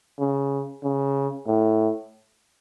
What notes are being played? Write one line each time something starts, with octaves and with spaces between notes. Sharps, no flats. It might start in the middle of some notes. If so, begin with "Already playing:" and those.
C#3
C#3
A2